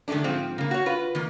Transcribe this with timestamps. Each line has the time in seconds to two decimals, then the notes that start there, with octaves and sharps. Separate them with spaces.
0.08 D3 D#3 G#3 A3 D4
0.24 G#2 F3 C4
0.58 C#3 A#3
0.71 F#4 C#5
0.86 F4 B4
1.15 D#3 A#3